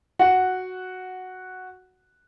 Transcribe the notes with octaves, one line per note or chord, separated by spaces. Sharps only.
F#4 F#5